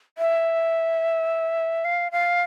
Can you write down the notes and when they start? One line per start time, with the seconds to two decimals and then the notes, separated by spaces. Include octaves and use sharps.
0.18 E5
1.85 F5
2.12 F5